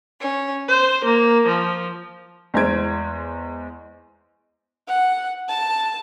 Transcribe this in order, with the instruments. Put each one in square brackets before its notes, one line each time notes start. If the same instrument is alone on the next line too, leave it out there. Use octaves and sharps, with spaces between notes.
[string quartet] C#4
C5
A#3
F3
[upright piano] E2 G#3 C5 G#6 D7
[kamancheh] F#5
A5